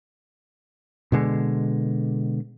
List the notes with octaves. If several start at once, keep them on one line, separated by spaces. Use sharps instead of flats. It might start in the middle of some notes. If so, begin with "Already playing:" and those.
B2 D3 G#3